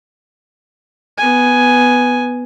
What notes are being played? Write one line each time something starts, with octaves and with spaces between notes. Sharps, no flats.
B3 G#5